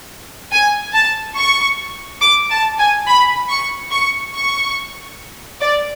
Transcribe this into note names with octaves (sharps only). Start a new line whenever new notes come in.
G#5
A5
C#6
D6
A5
G#5
B5
C#6
C#6
C#6
D5